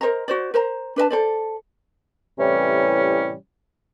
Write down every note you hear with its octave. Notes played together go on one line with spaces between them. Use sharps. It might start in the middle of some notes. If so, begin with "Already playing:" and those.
A#4 C5 D#5 A#5
F#4 C5 D5
A#4 C5 A#5
D4 B4 D#5 A5
A4 C5 D5
A2 C3 E3 G3 C#4